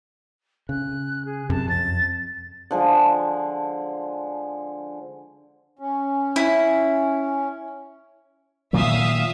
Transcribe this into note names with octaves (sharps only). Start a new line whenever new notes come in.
C#3 F#6
G#4
F#2 C3 A5
F2 A6
D3 F3 G#3
C#4
E4
A#2 D#3 F#3 E5 F5 D#6